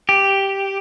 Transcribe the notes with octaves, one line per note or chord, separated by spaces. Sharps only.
G4